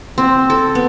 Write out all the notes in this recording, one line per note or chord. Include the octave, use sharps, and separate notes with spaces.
C4
A4
B3